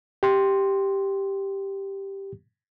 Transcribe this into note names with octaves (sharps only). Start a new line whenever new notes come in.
G4 C6